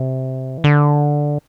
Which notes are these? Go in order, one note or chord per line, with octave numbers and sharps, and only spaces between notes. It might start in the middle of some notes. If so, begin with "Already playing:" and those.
Already playing: C3
E3
D3